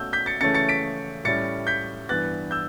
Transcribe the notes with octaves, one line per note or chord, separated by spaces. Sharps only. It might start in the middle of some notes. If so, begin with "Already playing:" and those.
Already playing: B2 A3 C#4 E6 G6
G6 B6
A6 C#7
C#3 E3 A3 C#4 A6 C#7
A6 C#7
B6 D7
A2 G3 C#4 A6 C#7
G6 B6
G2 E3 B3 F#6 A6
E6 G6